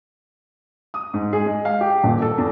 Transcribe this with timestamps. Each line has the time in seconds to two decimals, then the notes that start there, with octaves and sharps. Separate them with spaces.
0.94 D#6
1.14 G#2
1.33 G#4
1.46 G#3
1.65 F5
1.81 G4
2.04 D#1
2.22 A4
2.38 E2